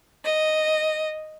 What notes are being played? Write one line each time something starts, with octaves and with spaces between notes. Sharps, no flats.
D#5